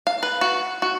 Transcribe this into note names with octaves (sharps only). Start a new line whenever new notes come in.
F5
B4
F#4
F#4